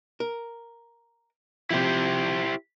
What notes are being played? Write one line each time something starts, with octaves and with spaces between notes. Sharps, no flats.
A#4
C3 F3 E4 G4 C5